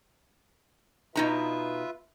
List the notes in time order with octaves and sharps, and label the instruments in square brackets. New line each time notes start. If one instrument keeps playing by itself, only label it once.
[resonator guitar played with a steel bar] B2 D#4 A#5 [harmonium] F4 B4 E5